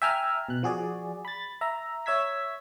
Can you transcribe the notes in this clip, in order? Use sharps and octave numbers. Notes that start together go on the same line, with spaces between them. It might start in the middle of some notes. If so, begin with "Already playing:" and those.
E5 G5 G#5 A#5 F6
B2 F#6
F3 F#4 G#4 D5
B5 A6
E5 A#5
C#5 E5 E6 G#6 B6